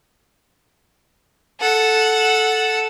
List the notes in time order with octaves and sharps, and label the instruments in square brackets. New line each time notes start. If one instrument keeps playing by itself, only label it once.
[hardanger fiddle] A4 F#5